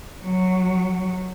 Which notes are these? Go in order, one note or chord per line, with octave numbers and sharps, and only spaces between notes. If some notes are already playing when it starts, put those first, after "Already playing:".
F#3